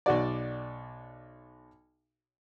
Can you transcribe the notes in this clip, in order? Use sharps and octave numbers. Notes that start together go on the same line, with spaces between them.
B1 F#4 D5